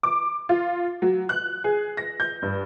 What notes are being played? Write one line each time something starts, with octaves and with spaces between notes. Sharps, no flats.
D6
F4
F#3
F#6
G#4
A#6
G6
G2